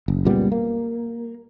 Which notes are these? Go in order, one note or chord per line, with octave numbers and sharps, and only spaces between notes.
F#1
C#2 A#2 G3 B3
A#3